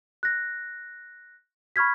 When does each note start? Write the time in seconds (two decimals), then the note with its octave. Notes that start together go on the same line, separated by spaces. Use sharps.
0.23 F#6 A#6
1.76 B5 C#6 F6 G#6 B6